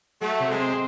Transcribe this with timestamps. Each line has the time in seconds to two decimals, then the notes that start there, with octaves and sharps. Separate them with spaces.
0.21 F#3 A3
0.40 C3
0.50 G#3
0.60 C4